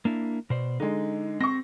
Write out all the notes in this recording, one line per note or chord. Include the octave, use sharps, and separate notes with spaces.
A#3 D4 E4
B2 C5 D5
D3 G#3 D#4
C4 C#6 A#6